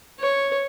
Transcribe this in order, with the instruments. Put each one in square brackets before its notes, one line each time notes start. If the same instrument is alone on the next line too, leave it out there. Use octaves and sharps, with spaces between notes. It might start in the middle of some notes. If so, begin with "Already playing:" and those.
[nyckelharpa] C#5